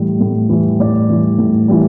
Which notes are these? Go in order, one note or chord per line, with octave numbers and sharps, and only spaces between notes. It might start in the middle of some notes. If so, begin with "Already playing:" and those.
Already playing: A2 E3 G3
A2
E3 G3
A2 D5
E3 G3
A2
E3 G3